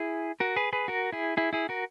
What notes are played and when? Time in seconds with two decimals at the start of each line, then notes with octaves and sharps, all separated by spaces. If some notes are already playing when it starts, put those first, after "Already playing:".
Already playing: E4 G#4
0.40 F#4 A#4
0.56 G#4 B4
0.73 G#4 B4
0.88 F#4 A#4
1.12 E4 G#4
1.37 E4 G#4
1.53 E4 G#4
1.69 F#4 A#4